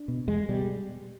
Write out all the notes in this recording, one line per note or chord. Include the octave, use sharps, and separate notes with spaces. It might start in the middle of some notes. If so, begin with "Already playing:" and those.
Already playing: D4
B2
E2 G#3
B2 G3